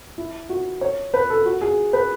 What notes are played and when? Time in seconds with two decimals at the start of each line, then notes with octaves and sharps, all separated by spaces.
0.18 E4
0.50 F#4
0.81 C#5
1.14 B4
1.30 A4
1.46 F#4
1.61 G#4
1.93 B4